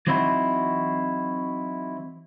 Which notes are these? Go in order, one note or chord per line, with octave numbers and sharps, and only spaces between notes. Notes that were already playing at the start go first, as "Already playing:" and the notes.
E3 F#3 C4 D#4 E4 F#4